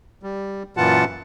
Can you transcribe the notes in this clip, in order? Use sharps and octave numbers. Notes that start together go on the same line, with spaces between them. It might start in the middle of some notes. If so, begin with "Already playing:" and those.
G3
F#2 A#2 E3 F4 F#5 A5